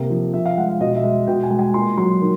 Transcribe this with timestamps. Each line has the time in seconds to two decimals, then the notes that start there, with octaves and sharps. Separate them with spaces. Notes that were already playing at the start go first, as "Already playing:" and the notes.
Already playing: C3 A#3
0.10 F3
0.34 F3 E5
0.45 F5
0.57 G#3 F#5
0.69 F5
0.81 B2 D#5
0.96 E5
1.04 G#3
1.27 B2 G5
1.43 G#5
1.51 G#3
1.59 G#5
1.74 A#2 C6
1.97 F#3 C6
2.21 D#3